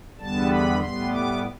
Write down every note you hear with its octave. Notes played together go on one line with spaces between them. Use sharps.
E2 D3 G3 B3 A5
B5
A2 G3 B3 C6
D6